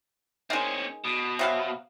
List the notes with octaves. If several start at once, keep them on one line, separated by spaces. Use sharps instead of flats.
D#3 G#3 C4 C#4
B2
C3 F#3 F5